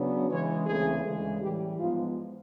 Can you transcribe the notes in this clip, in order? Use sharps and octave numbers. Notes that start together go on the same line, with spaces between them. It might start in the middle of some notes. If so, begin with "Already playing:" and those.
Already playing: C#3 F#3 B3 D4
C#3 E3 G#3 C#4 C#5
D2 C#3 E3 A3 C4 G#4
D2 C#3 E3 G#3
A2 E3 G3 G4
G#2 F3 G#3 B3 F4